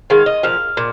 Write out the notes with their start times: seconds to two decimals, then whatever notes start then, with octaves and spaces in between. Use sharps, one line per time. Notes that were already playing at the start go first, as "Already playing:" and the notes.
0.10 D#3 G#3 F5
0.26 D#5
0.43 A#2 F3 F5
0.77 A#2